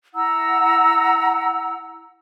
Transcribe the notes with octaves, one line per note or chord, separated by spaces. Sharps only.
E4 F#5 A#5 E6